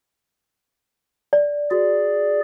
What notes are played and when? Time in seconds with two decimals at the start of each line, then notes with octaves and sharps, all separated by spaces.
1.33 D5
1.71 F#4 G#4 D5